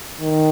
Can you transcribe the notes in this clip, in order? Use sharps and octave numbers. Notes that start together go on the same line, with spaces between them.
D#3